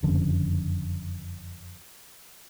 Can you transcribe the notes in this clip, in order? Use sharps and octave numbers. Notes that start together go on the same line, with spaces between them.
F#1 F2 D3 C#4